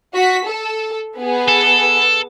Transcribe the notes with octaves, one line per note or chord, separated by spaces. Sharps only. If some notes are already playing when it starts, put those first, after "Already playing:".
F#4 B6
A4
B3 G#4
A4